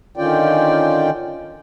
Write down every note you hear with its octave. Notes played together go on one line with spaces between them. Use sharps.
D3 D#3 C#4 F4 D5 G5